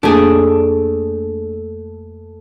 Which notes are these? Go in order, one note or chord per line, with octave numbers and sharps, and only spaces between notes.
F2 A3 A#3 D4 G#4